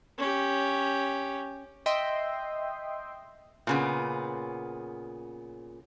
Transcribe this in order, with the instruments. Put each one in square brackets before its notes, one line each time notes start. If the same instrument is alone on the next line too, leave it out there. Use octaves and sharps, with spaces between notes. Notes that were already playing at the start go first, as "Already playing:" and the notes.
[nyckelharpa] C#4 G4
[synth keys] D#5 E5 G5 C6
[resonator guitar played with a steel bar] A#2 C#3 B3